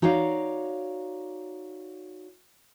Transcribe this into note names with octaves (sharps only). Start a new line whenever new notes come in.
D#4 F#4 C#5 D5 F5